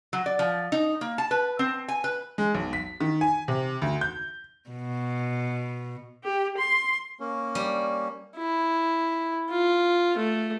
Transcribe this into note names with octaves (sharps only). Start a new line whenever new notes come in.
F#3
D5
F3
D#4
A#3
A5
B4
C4
G#5
B4
G#3
B1
B6
D#3
G#5
C3
D2
G6
B2
G4
C6
A#3 C#4
G3
E4
F4
A3